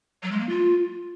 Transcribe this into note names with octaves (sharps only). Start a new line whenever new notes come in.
F#3
G#3
A#3
F4